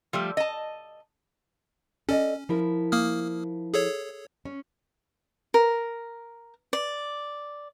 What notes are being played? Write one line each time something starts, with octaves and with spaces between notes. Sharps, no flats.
F3 G3 A3
D#5 A5
C#4 A4 D5 D#5
F3 E4 A#4
A#3 D#6 F6
G#4 A4 C#5
C#4
A#4
D5